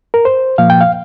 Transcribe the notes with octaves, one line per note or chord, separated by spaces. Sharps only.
A#4
C5
A#2 F3 A#3 F5
G5
F5